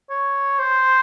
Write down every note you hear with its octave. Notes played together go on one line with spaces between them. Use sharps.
C#5
C5